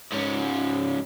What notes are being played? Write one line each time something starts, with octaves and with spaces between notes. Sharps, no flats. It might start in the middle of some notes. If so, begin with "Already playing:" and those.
G#2 C#4